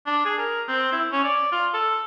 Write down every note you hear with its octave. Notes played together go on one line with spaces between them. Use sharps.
D4
G#4
A#4
C4
E4
C#4
D5
F4
A4